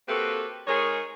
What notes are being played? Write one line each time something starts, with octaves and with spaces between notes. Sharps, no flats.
A#3 C4 F#4 G4 A4 B4
G#3 D#4 G#4 A#4 C#5